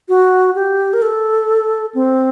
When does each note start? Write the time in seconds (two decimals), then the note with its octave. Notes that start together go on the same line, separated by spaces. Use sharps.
0.09 F#4
0.55 G4
0.93 A#4
1.02 A4
1.95 C4